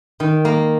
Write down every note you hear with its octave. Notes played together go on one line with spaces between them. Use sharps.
D#3
A#3